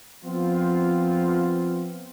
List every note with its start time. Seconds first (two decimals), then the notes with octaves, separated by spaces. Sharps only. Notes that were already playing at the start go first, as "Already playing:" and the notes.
0.24 F3 B3 C4 F4